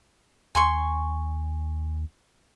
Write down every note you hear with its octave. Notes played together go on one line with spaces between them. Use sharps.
D#2 G#5 C6 C#6